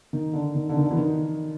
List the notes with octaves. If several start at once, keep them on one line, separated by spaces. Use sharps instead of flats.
D#3
D3
D#3
D3
D#3
D3
E3
D#3